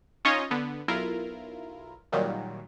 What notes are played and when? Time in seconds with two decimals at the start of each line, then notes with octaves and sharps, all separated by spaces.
0.25 C#4 D#4 F4 C#5 D#5
0.51 D3 B3
0.88 B1 E4 F4 A#4
2.12 A#2 D#3 F#3 G3